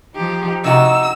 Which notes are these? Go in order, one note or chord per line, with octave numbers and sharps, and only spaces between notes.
F3 D#4 G4
C3 D#4 F#4 E6